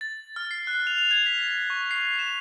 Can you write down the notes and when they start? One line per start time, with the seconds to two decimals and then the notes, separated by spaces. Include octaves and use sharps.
0.01 A6
0.36 F6
0.51 C7
0.67 F#6
0.87 F7
0.98 F7
1.11 G#6
1.26 B6
1.55 B6
1.70 C#6
1.91 C7
2.19 E7